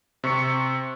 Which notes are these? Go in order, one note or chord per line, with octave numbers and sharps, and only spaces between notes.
C3 C#6 C#7